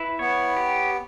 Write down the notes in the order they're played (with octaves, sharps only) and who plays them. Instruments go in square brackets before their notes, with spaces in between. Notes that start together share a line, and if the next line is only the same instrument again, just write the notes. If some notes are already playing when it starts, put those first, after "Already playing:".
Already playing: [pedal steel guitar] E4 B4
[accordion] B3 [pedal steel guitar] C#5
[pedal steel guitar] G4